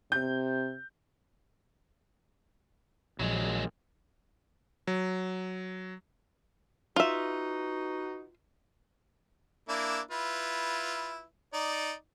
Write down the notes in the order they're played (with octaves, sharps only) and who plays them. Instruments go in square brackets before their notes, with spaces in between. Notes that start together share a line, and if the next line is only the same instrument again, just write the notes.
[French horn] C3 [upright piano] G6
[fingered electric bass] A#1 [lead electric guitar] F#3 G#3
[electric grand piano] F#3
[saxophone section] D#4 F#4 B4 [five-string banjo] F4 E5
[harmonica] A#3 D4 E4
E4 F4 B4
D#4 D5